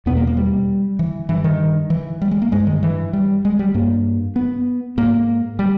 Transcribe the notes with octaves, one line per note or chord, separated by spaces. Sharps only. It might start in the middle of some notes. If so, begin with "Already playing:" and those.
E2 B2 B3
A#3
A#3
G3
E3
G2 E3
D#3
E3
G3
G#3
A#3
G2 G#3
D#3
E3
G3
G#3
G3
G2 A#3
B3
G#2 A#3
G3